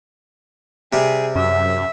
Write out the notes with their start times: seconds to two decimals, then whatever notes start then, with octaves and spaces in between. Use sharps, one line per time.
0.93 C3 G3 G#4
1.36 F#2 E5